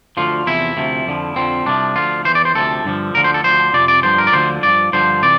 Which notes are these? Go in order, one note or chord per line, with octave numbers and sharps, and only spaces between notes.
D2 D3 F3 F4
E2 C3 F3 E4
D2 C3 F3
F2 D3 F3
F2 D3 F3 C4
C2 C3 F3 D4
D2 D3 F3 F4
E2 E3 C5
D5
C5
D2 C3 F3 A4
G2 D3 F3
D2 D3 F3 A#4
C5
A4
D2 D3 F3 C5
F2 C3 F3 D5
D5
G2 D3 F3 C5
A#4
D5
D2 D3 F3 C5
G2 F3 D5
G2 D3 F3 C5
C3 E3 D5